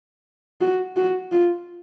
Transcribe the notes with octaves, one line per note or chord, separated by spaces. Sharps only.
F#4
F#4
F4